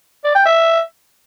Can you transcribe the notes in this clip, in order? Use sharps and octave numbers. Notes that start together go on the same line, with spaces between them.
D5
G5
E5